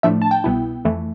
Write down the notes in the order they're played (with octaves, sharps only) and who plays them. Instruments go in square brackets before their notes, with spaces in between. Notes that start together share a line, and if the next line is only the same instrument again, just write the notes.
[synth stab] A2 F3 A3 D4 E5
A5
G5
C2 B2 B3 E4
F2 E3 A3